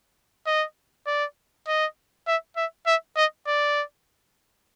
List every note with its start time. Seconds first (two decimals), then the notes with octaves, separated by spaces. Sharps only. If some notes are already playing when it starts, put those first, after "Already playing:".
0.46 D#5
1.07 D5
1.67 D#5
2.27 E5
2.56 E5
2.86 E5
3.16 D#5
3.47 D5